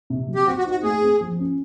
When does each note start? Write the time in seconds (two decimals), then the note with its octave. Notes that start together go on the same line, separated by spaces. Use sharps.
0.10 C3
0.28 F#3
0.35 G4
0.47 C4 F#4
0.58 F#4
0.65 D#4
0.71 F#4
0.83 A3 G#4
1.02 C4
1.21 F3
1.39 C#4